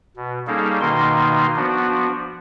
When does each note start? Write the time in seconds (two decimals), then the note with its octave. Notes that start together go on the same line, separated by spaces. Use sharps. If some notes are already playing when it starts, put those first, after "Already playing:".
0.16 B2
0.47 G3 A#3 C#4 D#4 G#4 A4
0.81 B2 D#3 A#3 D#4 C6
1.56 F3 B3 D4 F#4